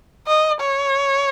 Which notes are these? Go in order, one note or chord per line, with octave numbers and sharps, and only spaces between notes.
D#5
C#5